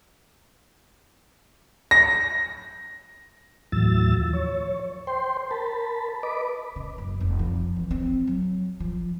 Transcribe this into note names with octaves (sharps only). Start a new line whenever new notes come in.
A#6
D#2 A2 E3 F#3 E6 A6
F3
C#5
C5 G5 C6
A#4 A5 B5
B4 D#5 B5 D6
C#3
F#1
F1
F3
E3
C4
F#3
F3